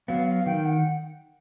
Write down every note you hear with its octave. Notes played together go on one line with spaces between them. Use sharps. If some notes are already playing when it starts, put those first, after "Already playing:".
F#3 B3 F5
F5
D#3 G5
F#5